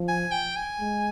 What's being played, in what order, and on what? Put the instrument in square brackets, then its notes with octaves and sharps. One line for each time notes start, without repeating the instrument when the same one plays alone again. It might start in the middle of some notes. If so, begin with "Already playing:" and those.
Already playing: [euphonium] F3
[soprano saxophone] G#5
G5
G#5
[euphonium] G#3